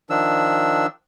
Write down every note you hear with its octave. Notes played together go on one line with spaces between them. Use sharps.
D#3 F3 D4 E6